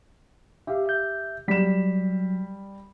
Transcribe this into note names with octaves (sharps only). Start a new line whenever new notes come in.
G4 E5 F5
E5 G6
F#3 G3 B6 E7